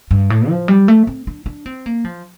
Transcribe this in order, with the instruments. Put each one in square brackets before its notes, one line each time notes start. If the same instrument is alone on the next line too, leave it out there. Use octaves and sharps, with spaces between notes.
[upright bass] G2
A2
F3
G3
A3
C4
D4
D4
C4
A#3
F3